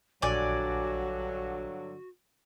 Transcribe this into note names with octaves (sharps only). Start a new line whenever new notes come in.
A#1 G2 D3 F#3 F#4 D5 G#5